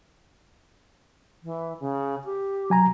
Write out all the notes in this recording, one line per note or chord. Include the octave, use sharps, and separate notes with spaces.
E3
C#3
G4
F#3 G#5 A#5